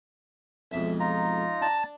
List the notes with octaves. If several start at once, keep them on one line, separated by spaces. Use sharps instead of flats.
B1 F2 G#2 E5
D#4 F4 A#5
D4 A5